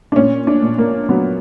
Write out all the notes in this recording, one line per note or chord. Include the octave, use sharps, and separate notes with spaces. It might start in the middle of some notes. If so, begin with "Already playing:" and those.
D4
A#2 C#4
D4
A#2
A#3
F#3 B3